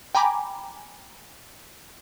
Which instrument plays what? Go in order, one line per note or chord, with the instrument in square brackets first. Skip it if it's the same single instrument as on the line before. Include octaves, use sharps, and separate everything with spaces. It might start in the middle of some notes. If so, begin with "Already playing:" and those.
[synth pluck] G5 G#5 A#5 B5 D6